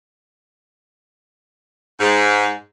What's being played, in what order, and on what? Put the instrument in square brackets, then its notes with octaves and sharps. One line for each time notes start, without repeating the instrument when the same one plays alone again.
[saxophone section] G#2